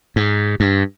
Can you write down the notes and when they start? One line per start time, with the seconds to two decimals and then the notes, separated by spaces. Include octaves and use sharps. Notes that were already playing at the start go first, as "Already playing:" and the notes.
0.16 G#2
0.60 G2